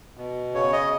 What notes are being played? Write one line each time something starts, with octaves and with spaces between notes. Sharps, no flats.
B2
C#3 C#5
D#5